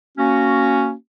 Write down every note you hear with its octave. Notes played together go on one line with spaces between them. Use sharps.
A#3 C#4 F#4